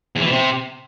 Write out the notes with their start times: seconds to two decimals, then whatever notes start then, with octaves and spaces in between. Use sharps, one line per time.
0.16 E2
0.21 E3
0.26 B2
0.32 C3